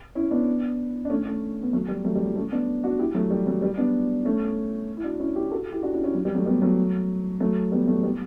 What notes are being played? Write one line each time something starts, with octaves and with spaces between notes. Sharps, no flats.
C#4 E4
B3 D4
D4
A3 C#4
A3 C#4
B3
F#3 A3
G3
F#3 A3
G3
F#3
A3 C#4
B3 D4
D4 F#4
E4 G4
F#3 A3
G3
F#3
G3
B3 D4
A3 C#4
E4
D4 F#4
C#4 E4
E4 G4
F#4 A4
E4 G4
D4 F#4
C#4 E4
C#4 E4
F#3
G3
F#3 A3
G3 B3
F#3 A3
F#3 A3
G3 B3
F#3 A3
G3 B3